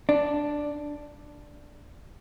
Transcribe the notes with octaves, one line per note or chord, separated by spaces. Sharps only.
D4